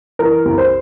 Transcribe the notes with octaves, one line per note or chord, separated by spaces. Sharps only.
E3 A#4
C2
C5